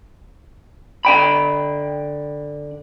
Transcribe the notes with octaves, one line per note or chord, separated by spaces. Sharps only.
D3 G5 B5